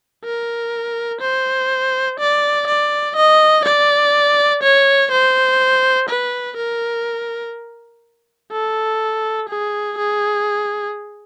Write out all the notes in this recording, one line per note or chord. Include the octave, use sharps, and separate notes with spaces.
A#4
C5
D5
D5
D#5
D5
C#5
C5
B4
A#4
A4
G#4
G#4